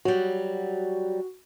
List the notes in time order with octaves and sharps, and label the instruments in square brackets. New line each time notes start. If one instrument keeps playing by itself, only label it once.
[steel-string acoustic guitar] F#3 G3 [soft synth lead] F#4